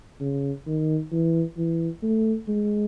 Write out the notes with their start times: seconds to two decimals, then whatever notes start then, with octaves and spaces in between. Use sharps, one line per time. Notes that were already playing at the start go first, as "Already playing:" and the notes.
0.20 C#3
0.66 D#3
1.12 E3
1.57 E3
2.03 A3
2.48 G#3